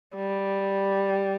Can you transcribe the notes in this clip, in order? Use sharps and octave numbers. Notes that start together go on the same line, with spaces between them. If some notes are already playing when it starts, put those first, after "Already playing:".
G3